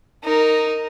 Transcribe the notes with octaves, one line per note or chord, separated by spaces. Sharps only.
D#4 A#4